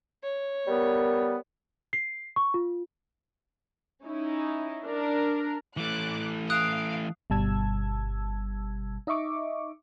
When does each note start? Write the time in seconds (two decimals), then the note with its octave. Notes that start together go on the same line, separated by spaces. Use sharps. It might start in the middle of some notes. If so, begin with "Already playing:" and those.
0.23 C#5
0.67 G3 B3 A#4
1.93 C7
2.36 C#6
2.54 F4
4.04 C#4 D#4 E4
4.85 D4 A#4
5.77 E3 A3 D6 F#6
6.50 F5 D#6 F#6 D7
7.30 G1 B2 G3 A5 E6 G#6
9.07 D#4 D#5 E5 C#6 D6